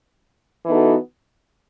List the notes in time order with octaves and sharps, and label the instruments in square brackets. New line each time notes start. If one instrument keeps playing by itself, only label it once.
[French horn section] E3 B3 D#4 F#4 A4